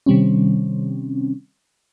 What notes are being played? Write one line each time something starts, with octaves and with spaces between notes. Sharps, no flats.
C3 D#3 G3 C4 C#4